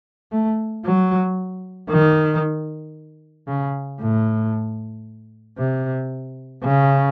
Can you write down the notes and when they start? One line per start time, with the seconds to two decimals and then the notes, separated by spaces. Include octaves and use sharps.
0.32 A3
0.84 F#3
1.89 D#3
3.47 C#3
4.00 A2
5.58 C3
6.64 C#3